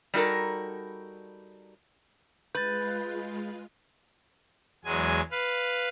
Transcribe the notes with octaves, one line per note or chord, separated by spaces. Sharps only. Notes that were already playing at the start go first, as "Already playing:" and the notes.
G3 D#4 F#4 A4 A#4
G#3 F4 B4 G6 A6
E2 F#3 G#3 G#5
B4 F5